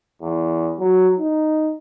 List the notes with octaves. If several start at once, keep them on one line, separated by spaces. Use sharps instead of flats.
E2
F#3
D#4